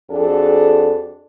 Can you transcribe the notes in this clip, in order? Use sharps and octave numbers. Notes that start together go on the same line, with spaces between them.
F2 D4 F#4 G#4 A4